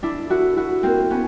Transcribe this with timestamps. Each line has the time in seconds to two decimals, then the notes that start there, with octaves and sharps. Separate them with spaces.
0.03 D4 E4
0.30 E4 F#4
0.56 E4 F#4
0.83 A#3 C4
1.11 B3 C#4